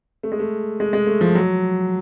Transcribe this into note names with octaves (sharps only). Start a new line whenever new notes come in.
A3
G#3
A3
G#3
G#3
A3
F3
F#3